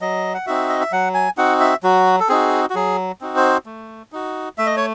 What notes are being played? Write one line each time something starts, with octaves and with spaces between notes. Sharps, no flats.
F#3 D#5
F#5
C4 D#4 F#4 E5
D#5
E5
F#3 F#5
G#5
C4 D#4 F#4 F#5
E5
F#3 F#4
A4
C4 D#4 F#4 G#4
F#4
F#3 G#4
C4 D#4 F#4
C5
A3
D#4 F#4
A3 E5
D#5
C#5